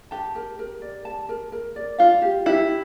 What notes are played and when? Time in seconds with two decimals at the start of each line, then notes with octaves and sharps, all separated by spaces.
0.11 G4 A5
0.35 A#4
0.59 A#4
0.82 D5
1.05 A5
1.29 A#4
1.52 A#4
1.76 D5
1.98 F4 F5
2.22 G4
2.46 E4 G4